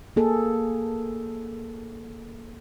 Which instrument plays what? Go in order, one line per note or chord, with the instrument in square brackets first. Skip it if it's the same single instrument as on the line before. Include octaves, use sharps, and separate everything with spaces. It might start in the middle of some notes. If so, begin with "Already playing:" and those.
[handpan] A#3 G#4 A4